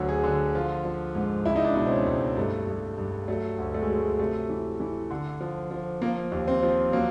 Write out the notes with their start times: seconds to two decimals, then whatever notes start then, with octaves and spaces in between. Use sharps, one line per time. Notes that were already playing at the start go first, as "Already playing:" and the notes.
Already playing: D2 D3 F#3
0.09 G#4
0.24 D3
0.55 F3 F4
0.85 F3
1.15 G#2
1.46 C#2 E4
1.56 D#4
1.65 D4
1.75 B2 D#4
1.87 C4
1.91 C#4
2.06 C#2
2.36 G2 A3
2.67 G2
2.98 G2
3.28 F#3 A3
3.58 D2
3.74 A3
3.82 G#3
3.89 F#3
3.98 G#3
4.19 C3 A3
4.49 E3
4.80 E3
5.10 D3
5.40 F3
5.71 F3
6.02 F3 A#3
6.32 D#2
6.48 C4
6.62 F3
6.92 F#3 A#3